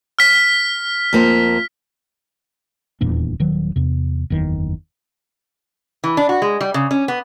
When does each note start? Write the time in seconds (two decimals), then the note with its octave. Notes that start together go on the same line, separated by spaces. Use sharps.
0.19 F6 B6
1.13 F2 A#3 C5
3.01 D#1 E2 A#2 D4
3.40 D#1 D#3 F#3
3.76 E2 C3
4.30 F#1 E2 D#3
6.04 E3
6.17 D4
6.29 F#4
6.42 G#3
6.61 G3
6.74 C#3
6.91 C#4
7.08 B3